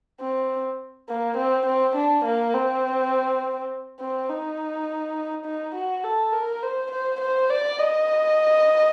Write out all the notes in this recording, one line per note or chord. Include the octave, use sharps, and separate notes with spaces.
C4
A#3
C4
C4
D4
A#3
C4
C4
D#4
D#4
F#4
A4
A#4
C5
C5
C5
D5
D#5